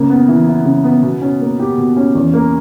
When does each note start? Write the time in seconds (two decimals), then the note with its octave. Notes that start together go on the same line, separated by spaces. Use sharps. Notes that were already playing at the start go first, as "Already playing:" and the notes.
Already playing: C#3 A#3
0.10 B3
0.28 E3
0.48 E4
0.65 C#3
0.84 B3
1.03 B2
1.22 C#4
1.41 A#3
1.59 G4
1.78 B2
1.97 C#4
2.15 E2
2.34 A#3